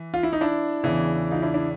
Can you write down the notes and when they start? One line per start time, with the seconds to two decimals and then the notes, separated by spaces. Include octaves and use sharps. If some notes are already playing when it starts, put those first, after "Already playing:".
Already playing: E3
0.14 F4
0.23 E4
0.33 D#4
0.41 D4 E4
0.84 E2 C#3 E3
1.31 D#4 F4
1.42 D4 E4
1.54 D4 E4